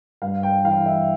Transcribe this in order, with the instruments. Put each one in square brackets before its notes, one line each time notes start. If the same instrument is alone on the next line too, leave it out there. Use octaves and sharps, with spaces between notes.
[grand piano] G2 F5
G5
E3 F5
E5